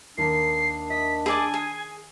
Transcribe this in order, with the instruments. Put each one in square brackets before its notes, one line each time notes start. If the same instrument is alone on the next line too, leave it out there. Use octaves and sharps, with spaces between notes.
[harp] D#2 A#4 B6 [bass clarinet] D4 [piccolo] C7
[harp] D#5 [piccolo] B6
[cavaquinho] G#4 D5 A5 [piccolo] G#5 [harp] B5 E6
[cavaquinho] G#4